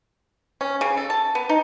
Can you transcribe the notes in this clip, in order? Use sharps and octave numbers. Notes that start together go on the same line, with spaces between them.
C#4
C#3
A4
A5
B3
D#4